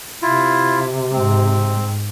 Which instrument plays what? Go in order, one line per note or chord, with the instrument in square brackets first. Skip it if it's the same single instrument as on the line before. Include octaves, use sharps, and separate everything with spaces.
[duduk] C3 [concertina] E4 F4
[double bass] G#2 [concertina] C4